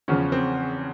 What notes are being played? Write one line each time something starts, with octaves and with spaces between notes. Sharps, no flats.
E2 C#3 F3 C#4
C4